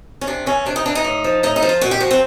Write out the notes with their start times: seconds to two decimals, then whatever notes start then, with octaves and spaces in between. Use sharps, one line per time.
0.21 C#4
0.27 C3 D4
0.46 E3 C#4
0.66 C3 D4
0.76 D#4
0.86 E3 D4
0.95 D#4
1.04 A2
1.24 F3
1.43 A2 D#4
1.56 D#4
1.62 F3
1.69 F4
1.81 A#2 F#4
1.91 G4
2.01 F3 F#4
2.11 C4